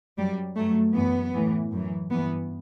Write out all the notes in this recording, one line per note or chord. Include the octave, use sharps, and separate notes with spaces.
F#2 F#3 G3
G2 F#3 A3
F#2 E3 B3
A2 E3
F#2 E3
G2 E3 B3